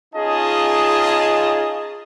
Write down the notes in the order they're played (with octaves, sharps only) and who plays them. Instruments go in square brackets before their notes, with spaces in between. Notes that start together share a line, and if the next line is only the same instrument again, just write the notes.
[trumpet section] C#4 D#4 F4 G#4 D#5 A5